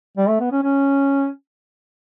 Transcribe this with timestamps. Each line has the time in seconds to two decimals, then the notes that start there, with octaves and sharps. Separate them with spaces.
0.18 G3
0.29 A3
0.40 B3
0.52 C#4
0.63 C#4